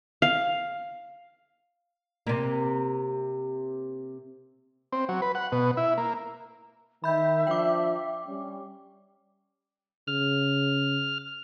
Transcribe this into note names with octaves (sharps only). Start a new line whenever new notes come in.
F5
C3 A#3
C4
F#3
B4
F#5
B2
E4
A#3
D#3 E5 B5 G6
F3 D4 G5 D6
G3 C#4
C#3 F6